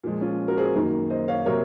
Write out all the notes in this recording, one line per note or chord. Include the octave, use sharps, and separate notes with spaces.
A#2 F3 G#3
C#4 F4
F#4 A#4
G#4 C5
F#2 D#3 F#3 A#3
C5 D#5
C#5 F5
C3 F#3 A#3 A#4 C#5